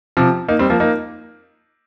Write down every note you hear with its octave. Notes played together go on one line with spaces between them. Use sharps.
C3 F3
A#3 D#4
G3 C4
F3 A#3
A#3 D#4